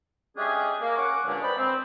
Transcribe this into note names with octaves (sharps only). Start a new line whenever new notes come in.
G#3 A3 C#4 D4 G4 G#4
A#3
C#4 F#5 C#6 D6
G2 A#2 D3 G#3 C#4 D4
B4 C5 D5 D#5 G5 B5
C4